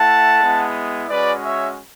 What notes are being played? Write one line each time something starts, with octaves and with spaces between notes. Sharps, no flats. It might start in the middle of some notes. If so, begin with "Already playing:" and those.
Already playing: A3 E4 F#5 A5
G#3 B3 E4
G#3 C#4 F#4 B4 D5
C#5 E5